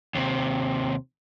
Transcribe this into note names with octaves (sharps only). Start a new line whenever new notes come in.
D#2 C3